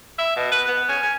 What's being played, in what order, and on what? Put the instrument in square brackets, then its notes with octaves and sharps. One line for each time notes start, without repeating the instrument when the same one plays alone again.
[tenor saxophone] E5
B2
B4
B3
C#4
C#4